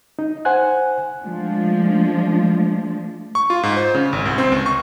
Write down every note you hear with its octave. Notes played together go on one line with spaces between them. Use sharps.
D#4
C5 F#5 G#5 F#6
F3 G#3 A3 D4
C#6
F4
G#2
C5
C#3
G#1
C2
C4
C#2
C#6